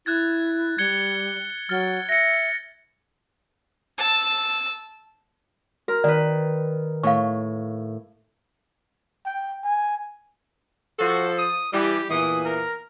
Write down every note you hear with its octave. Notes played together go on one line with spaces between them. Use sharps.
E4 F#6 G#6 A6
G3 G#6 C#7 G7
F#3 F6 A6
E5 A#6 C#7
A5 E6
F#4 A#4
D#3 B4 D5
A2 F5 C#6
G5
G#5
F3 F#4 A4
D#6
E3 G3 G4
E2 A#2 E3 D#6
A#4